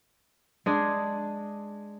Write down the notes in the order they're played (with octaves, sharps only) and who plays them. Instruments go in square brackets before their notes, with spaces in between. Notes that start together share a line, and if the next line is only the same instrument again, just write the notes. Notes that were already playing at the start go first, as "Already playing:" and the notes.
[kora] G#3 D4 G#4